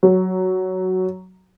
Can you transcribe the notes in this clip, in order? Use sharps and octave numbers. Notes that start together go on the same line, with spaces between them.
F#3